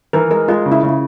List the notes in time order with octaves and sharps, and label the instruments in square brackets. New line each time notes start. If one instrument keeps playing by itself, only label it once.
[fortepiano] E3 [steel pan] A#4
[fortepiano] G#3 [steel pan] A#4
[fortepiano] G#3 [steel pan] F4
[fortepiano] C#3
[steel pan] E4
[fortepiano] C#3